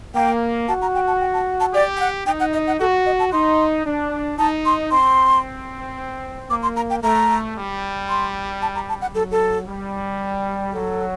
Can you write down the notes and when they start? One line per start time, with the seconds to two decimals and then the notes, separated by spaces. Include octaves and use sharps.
0.15 A#3 G5
0.68 F#4 A5
0.82 A#5
0.95 G5
1.07 A5
1.21 G5
1.34 A5
1.60 A5
1.74 G4 D5
1.97 G5
2.00 F#5
2.26 D#4 G5
2.40 F#5
2.53 D#5
2.67 F#5
2.80 F#4 A4
3.06 D#5
3.19 A5
3.32 D#4 C6
3.85 D4
4.38 D#4 A5
4.65 C6
4.91 C4 C6
6.50 A#3 D6
6.63 C6
6.76 A#5
6.90 G5
7.03 A3 A#5
7.56 G3
8.09 C6
8.62 A5
8.75 A#5
8.89 A5
9.01 F#5
9.14 F#3 A4
9.31 A4
9.68 G3
10.73 F#3 A4